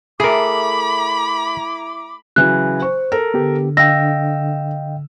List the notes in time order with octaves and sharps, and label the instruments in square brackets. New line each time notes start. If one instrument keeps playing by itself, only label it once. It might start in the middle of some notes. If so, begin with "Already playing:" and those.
[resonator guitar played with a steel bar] A3 [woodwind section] E4 D6 [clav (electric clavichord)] G#4 A#4 [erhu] B5
[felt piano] C#3 E3 F#3 [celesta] F#6
[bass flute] C5 [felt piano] C#6
[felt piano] A4 A#4
[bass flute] D3 [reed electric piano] B3 G4
[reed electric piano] D#5 F5 G5 [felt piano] E6 [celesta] A#6